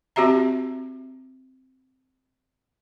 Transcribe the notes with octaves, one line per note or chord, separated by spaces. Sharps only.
C4 F#4 G4 E5 A#5